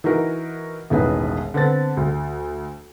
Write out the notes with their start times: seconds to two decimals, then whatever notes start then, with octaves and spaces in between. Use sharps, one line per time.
0.04 E3 D#4 F#4 A#4
0.90 E1 A1 D#3 B3 G#4 B4
1.54 D3 B3 C4 A6
1.97 D2